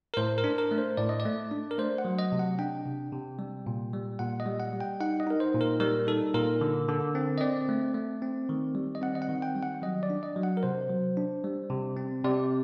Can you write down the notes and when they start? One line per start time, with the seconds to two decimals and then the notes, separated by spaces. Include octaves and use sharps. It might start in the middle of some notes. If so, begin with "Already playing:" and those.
0.14 A#4
0.17 A2 C5
0.38 A#4
0.44 D4
0.58 A#4
0.71 A3
0.78 C5
0.97 A2 D5
1.09 D#5
1.20 D5
1.25 A3
1.51 D4
1.71 A#4
1.78 A3 C5
1.98 F#5
2.05 F#3
2.19 D#5
2.32 C3
2.39 F#5
2.59 D4 G5
2.85 C3
3.12 C3
3.39 G3
3.67 A#2
3.93 G3
4.19 A#2 F#5
4.40 D#5
4.46 G3
4.60 F#5
4.73 G3
4.81 G5
5.00 D#4 F#5
5.20 D#5
5.27 D#4 A#4
5.40 C5
5.54 A#2
5.61 A#4
5.80 G3 A#4
6.07 D#4 A4
6.34 A#2 A#4
6.61 D3
6.88 D3
7.15 C4
7.38 D#5
7.41 C4 D5
7.69 A3
7.94 A3
8.22 C4
8.49 D#3
8.75 G3
8.95 D#5
9.02 C4 F#5
9.15 D#5
9.22 F#5
9.29 D#3
9.42 G5
9.56 G3
9.63 F#5
9.82 F#3 D#5
10.03 D5
10.10 D4
10.23 D#5
10.36 F#3
10.43 F#5
10.57 A#4
10.63 C3 C5
10.89 F#3
11.17 D4
11.44 G3
11.70 C3
11.97 C4
12.24 C3 D5